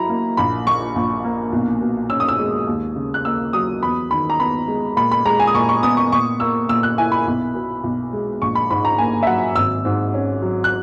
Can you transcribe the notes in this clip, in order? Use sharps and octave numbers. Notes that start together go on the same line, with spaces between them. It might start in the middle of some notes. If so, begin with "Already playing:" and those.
Already playing: F#3 E4 A#5 B5
A#3
A#1 B5
A#2 C#6
A#1
A#3
B1
B2
C#4 E6
D#6
E6
G#3
D#2
C#3
F#6
A#3 E6
F#3 D#6
E2 B5
D#3 B5
A#5
B3 B5
G#3
A#2 B5
B5
G#3 A#5
G#5
D#6
A#2 C#6
C#6
B3 D#6
C#6
A#2 C#6
A#3 E6
A#2 E6
F#6
E4 G#5
B5
B1
B2
B1
G#3
A#1 C#6
B5
G#2 B5
A#5
A#3 G#5
E5
F#3 F#5
G#1 E6
G#2
C#4
F#3
F#6